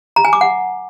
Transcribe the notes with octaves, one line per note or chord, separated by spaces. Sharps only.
A#5
G#5
D6
F#5